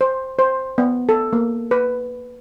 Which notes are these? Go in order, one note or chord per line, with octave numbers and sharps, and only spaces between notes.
C5
C5
B3
A4
A#3
B4